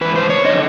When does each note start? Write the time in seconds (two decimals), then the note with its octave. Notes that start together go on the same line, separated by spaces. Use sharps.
0.01 G#2 E3 B4
0.16 C5
0.30 C#5
0.44 D3 F3 D#5